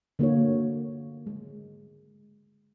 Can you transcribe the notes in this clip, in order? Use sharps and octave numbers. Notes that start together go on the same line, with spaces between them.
D3 A#3 F#4 C#5
G#3